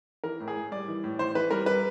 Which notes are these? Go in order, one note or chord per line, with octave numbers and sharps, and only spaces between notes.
E3 A#4
A2
G#4
A2
G3 D5
E3
A2
E3 C5
E3 B4
G3 A#4
G3 B4